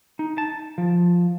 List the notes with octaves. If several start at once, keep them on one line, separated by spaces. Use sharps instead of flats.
D#4
A5
F3